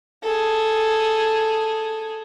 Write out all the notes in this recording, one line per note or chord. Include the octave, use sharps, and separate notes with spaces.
G#4 A4